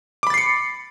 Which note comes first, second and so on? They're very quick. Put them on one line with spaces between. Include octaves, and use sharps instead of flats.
D6 B5 A6 C7 C#7